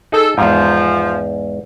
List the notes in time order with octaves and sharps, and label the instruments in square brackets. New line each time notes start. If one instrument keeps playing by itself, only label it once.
[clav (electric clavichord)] D#4 G#4 [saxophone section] A4
[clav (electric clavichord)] E2 G#2 [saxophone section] F3